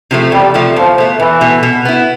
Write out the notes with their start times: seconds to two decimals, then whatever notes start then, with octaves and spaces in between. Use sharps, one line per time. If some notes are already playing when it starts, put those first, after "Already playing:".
0.11 C3 F3 A3
0.32 E2 G3
0.54 C3 F3 A3
0.76 E2 F3
0.98 B2 A3
1.19 E2 E3
1.41 B2 A3
1.63 B2
1.85 B3 E4